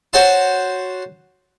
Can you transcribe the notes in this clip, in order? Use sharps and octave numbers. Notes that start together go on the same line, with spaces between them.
F#4 C5 C#5 F#5 A5 C6